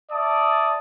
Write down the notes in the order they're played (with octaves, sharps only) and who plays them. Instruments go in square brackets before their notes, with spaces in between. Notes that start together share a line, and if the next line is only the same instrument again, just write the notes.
[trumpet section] D5 E5 A5 D#6